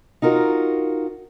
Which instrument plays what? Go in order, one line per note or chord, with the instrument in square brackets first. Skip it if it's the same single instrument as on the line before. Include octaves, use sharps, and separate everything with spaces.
[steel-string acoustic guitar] D#4 F4 F#4 A#4